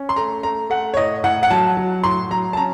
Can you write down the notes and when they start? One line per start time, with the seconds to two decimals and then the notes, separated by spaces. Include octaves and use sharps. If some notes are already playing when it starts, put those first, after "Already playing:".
Already playing: C#4
0.09 C6
0.16 A3 A#5
0.43 A3 A#5
0.70 A3 F#5
0.94 C#5
0.97 A2 D#5
1.24 A2 F#5
1.43 F#5
1.51 F#3 A5
1.77 F#3
2.03 A2 C6
2.30 F#3 A#5
2.53 A5
2.57 C#4 A#5